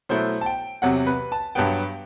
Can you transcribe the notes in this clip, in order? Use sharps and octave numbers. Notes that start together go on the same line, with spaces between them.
B2 F#3 A3 E4 C5
A5
G5
E2 C3 F#3 F#5
B4
A5
G2 F#3 B3 G5